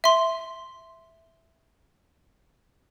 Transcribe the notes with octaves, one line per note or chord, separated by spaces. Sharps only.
E5 C6